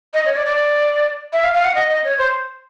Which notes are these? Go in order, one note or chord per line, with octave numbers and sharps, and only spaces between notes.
D#5
C#5
D5
D5
E5
F5
F5
F#5
D#5
D#5
C#5
C5